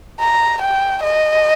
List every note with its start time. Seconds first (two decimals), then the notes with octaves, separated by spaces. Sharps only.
0.20 A#5
0.61 G5
1.04 D#5